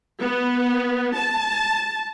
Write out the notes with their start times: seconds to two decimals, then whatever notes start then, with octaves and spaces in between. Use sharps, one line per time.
0.20 B3
1.15 A5